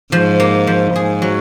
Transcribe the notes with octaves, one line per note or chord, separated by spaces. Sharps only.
G#2 F3
A#3
F3
G#2 G#4
F#3